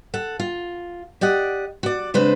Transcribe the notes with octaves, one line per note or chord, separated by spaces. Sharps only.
A4 F#5
F4
G4 D5 D#5 F#5
F#4 D5
C#3 G#3 C4 D4 B4 C5